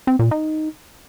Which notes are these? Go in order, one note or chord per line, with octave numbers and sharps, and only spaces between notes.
C4
A#2
D#4